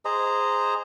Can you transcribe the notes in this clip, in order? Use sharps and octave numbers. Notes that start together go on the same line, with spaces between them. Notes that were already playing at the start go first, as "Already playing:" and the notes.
G#4 C5 D#5 A#5